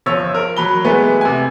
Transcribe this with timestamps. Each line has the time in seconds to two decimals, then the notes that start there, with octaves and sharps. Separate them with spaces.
0.06 G1 F3 C#5 E6
0.34 A#4
0.57 F#3 B5 G7
0.84 E3 G#3 A3 B3
1.21 C3 G#5